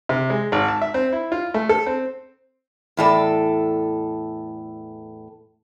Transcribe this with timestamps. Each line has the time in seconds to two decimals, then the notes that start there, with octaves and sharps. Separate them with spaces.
0.09 C3
0.30 G#3
0.52 G#1
0.68 A5
0.81 E5
0.94 C4
1.13 E4
1.32 F4
1.54 A3
1.69 A4
1.86 C4
2.97 E2 A2 A4 D5